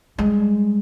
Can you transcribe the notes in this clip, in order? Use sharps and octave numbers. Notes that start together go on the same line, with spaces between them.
G3 G#3